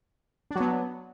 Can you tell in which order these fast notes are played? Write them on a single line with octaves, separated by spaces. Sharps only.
D4 F#3 B3